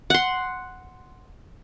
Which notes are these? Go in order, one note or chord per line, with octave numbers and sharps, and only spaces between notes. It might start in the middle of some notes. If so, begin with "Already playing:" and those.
F#5 C6